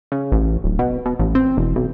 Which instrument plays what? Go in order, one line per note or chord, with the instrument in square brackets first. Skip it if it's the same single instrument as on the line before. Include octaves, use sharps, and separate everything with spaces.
[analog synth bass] C#3
A1
D1
B2
B2
A1
C4
E1
B1